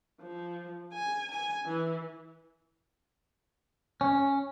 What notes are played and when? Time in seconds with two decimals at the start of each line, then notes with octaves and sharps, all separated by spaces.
0.22 F3
0.93 G#5
1.31 G#5
1.66 E3
4.01 C#4